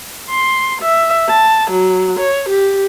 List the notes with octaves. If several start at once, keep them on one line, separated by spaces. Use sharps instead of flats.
C6
E5
A5
F#3
C#5
G4